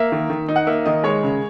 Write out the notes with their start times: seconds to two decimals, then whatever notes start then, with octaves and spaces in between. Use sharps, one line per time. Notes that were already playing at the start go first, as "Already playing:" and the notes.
Already playing: A#3 E5
0.12 D#3
0.30 D#3
0.48 D#4
0.56 F#5
0.67 A#3 E5
0.86 D#3 D#5
1.04 G#3 C#5
1.23 C#3